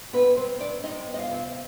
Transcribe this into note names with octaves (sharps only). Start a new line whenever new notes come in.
C3 B3 B4
C3 C4 C5
C3 D4 D5
C3 D#4 D#5
B3
D#5
F4 F5
C3